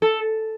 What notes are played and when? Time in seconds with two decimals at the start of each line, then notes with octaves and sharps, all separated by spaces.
0.02 A4